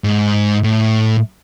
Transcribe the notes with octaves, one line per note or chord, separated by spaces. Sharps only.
G#2
A2